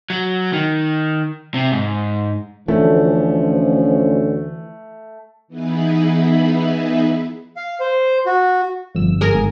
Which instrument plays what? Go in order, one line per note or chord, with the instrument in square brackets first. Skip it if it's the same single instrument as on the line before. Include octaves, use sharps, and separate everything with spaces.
[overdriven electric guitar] F#3
D#3
C3
G#2
[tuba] D2 [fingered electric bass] E3 [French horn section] F3 C#4 [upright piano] A3
[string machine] E3 B3 D#4 E4 G#4 B4
[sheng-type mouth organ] F5
C5
F#4
[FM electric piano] G1 F2 E6
[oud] G#4 A#4
[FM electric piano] G#1